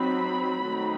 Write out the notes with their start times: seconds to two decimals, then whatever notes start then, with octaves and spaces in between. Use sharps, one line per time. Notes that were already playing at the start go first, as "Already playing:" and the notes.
Already playing: F#3 C4 D#4 B5
0.64 D#3 F#3 A3 C4 D#4